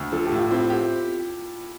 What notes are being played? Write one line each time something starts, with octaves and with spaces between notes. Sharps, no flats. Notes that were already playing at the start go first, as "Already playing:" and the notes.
Already playing: D2
F3 A4
G4
A2
F4
C4 E4
G4